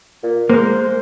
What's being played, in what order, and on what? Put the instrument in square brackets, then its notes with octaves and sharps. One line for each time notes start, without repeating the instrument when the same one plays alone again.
[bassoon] A#2
[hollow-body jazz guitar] G#3 A#3 [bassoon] C5